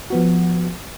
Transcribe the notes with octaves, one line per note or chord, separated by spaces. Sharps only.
F3 B3 F#4